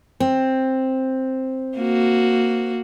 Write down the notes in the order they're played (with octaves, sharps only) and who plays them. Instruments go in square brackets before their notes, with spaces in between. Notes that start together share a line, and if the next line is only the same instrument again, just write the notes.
[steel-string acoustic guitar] C4
[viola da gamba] A#3 F#4